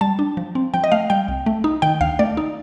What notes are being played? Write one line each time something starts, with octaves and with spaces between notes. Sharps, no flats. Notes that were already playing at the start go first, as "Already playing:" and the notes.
G3 A5
D4
F3
C4
F3 G5
D#5
A3 F5
G3 G5
C2
A3
D#4
D#3 G5
D2 F5
A3 D5
D#4